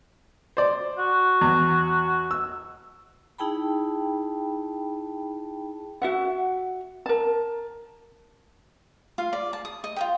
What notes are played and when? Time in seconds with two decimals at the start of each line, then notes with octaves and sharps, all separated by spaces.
0.57 C5 D5
0.98 F#4
1.41 E2
2.31 E6
3.38 D#4 E4 G#4 G5 A5 B5
6.02 F#4 E5 F#5
7.06 A#4 A5
9.18 F4 F5
9.33 D5
9.53 A5
9.65 D#6
9.84 D#5
9.96 F4 A#4 G5